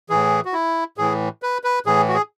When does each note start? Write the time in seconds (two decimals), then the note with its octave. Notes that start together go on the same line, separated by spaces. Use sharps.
0.10 A2 E3 G#4
0.45 F#4
0.53 E4
0.98 A2 E3 G#4
1.43 B4
1.64 B4
1.86 A2 E3 G#4
2.09 F#4
2.15 G#4